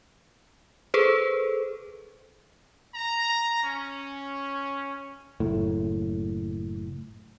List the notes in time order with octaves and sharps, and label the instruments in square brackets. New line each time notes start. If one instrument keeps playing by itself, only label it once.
[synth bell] G#4 A4 B4 C5
[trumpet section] A#5
C#4
[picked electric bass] F#1 A2